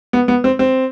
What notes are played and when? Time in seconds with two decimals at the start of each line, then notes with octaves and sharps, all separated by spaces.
0.13 B3
0.28 B3
0.44 C4
0.59 C4